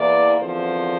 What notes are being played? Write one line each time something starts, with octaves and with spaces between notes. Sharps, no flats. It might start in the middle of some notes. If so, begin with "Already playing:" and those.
Already playing: E2 E3 A#3 D5
E2 D3 F3 C4 C5